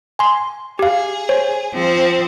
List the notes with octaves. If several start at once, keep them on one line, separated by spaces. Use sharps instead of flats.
G#5 C6
G4 G#4 F5
C5 C#5
F3 C4